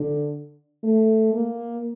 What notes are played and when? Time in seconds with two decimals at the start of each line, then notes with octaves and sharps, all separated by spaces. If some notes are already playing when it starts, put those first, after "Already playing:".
Already playing: D3
0.84 A3
1.34 A#3